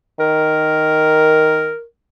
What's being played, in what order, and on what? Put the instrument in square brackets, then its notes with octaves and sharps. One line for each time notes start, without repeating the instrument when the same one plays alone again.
[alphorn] D#3 [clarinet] A#4